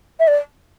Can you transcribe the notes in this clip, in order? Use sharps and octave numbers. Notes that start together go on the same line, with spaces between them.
E5
D5